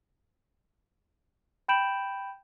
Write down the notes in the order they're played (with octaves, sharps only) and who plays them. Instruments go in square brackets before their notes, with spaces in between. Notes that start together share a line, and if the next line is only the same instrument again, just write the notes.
[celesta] G5 B5 G6 D7 E7 F#7